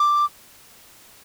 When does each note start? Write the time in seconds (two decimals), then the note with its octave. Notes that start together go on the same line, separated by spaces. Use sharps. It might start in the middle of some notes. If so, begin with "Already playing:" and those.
Already playing: D6